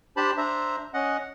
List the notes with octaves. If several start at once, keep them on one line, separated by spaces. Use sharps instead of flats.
D4 G4 C5 A5 B5
D4 C5 E5 A#5
C#4 D#5 F#5